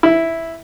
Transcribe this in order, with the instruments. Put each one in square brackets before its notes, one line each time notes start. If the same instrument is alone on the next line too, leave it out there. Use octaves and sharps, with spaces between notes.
[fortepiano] E4